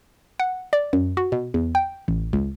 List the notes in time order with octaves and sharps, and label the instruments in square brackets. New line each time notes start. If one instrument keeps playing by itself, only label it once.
[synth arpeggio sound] F#5
D5
F#2
F#4
B2
E2
G5
A1
C#2